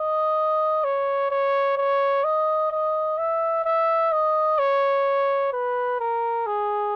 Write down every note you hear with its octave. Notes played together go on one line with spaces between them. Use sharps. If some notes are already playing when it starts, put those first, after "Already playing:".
Already playing: D#5
C#5
C#5
C#5
D#5
D#5
E5
E5
D#5
C#5
B4
A#4
G#4